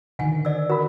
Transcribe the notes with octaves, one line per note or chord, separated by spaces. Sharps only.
D3 D#3 F#5 G#5
D5 E6
F#4 A#4 B5